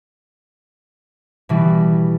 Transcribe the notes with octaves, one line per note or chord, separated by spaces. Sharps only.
B2 E3 G3